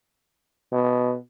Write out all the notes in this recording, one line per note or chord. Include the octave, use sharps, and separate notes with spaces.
B2